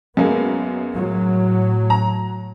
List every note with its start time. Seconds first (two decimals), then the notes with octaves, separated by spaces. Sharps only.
0.17 F#2 G#3 A#3 B3
0.93 A2 F#3
1.90 A#5